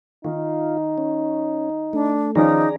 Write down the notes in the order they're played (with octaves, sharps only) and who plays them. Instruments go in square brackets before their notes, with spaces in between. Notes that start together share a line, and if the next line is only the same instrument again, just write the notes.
[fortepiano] D#3 [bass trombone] D#4 [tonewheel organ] F4
[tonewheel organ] C#4
[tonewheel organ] A3 [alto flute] D4
[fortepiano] D#3 F3 C#4 [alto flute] D#4 [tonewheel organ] G#4 D5 A#5